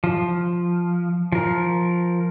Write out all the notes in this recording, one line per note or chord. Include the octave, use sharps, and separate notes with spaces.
F3
F3 A#4